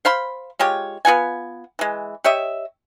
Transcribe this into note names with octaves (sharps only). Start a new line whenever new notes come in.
C5 F5 B5 C6
G#3 F4 G4 C#5
B3 F4 F#5 G#5
E3 G#3
G4 C#5 D#5 E5